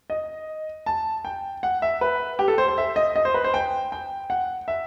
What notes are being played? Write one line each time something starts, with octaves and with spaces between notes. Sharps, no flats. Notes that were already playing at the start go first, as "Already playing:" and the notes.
D#5
A5
G5
F#5
E5
B4
G4
A4
C5
C5
E5
D#5
D#5
C5
B4
C5
G5
G5
F#5
E5